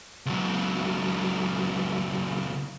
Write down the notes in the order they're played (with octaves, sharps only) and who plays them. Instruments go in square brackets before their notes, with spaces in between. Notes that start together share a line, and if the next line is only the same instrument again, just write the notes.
[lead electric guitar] C#2 F#3